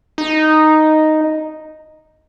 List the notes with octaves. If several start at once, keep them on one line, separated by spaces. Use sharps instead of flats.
D#4